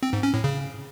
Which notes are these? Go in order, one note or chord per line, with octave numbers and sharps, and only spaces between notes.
C4
G#2
C#4
A2
C#3